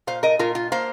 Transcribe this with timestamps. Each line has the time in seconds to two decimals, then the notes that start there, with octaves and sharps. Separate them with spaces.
0.07 A#2 C5 F5
0.23 A#4 D#5
0.39 A#2 F4 A#4
0.55 F4
0.72 A#3 C5 F5